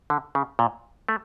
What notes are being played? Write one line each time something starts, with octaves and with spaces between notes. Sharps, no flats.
D3
C#3
A#2
A3